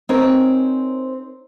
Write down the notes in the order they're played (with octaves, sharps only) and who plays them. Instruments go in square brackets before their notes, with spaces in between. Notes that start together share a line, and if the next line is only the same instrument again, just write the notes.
[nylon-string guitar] C4 D#4 G#4 A#4 C#5